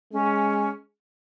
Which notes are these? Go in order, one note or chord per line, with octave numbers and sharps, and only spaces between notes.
G#3 C#4